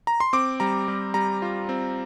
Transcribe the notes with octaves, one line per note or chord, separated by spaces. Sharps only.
A#5
C6
C4 D6
G3 A#5
G3
G3 A#5
F4
C4